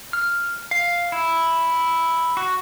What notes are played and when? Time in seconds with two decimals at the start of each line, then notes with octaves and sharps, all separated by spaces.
0.13 F6
0.71 F5
1.12 E4
2.37 F#4